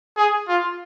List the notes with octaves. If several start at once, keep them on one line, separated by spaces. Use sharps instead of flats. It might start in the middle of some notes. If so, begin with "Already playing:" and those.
G#4
F4